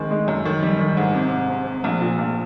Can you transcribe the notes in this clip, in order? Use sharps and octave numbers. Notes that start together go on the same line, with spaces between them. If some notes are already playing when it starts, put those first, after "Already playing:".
Already playing: D#3 G#3 C4
G#3
F#2
D#3
G3
D#3
G#2
C3
C3
C3
C3
A#1
A#2
A#1